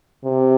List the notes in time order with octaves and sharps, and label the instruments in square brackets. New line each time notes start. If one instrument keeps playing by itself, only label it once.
[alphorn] C3